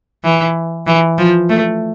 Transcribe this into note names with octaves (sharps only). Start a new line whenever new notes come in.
E3
E3
F3
A3